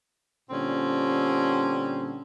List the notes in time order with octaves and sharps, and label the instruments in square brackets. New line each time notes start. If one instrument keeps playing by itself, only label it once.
[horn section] A#2 D3 G3 C4 C#4